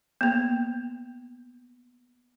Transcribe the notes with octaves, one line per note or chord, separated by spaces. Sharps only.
A#3 B3